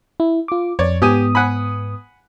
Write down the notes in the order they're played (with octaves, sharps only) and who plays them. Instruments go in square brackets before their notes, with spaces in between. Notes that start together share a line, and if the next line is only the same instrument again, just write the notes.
[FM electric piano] E4
F4 D6
[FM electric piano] F2 [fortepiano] C#5 D5
[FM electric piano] G#2 B3 D#6 [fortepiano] G4 G#5
[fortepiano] F#5 G#5 B5